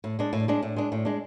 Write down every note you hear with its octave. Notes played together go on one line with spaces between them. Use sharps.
A2
G#3 D4
A2
G#3 D4
A2
G#3 D4
A2
G#3 D4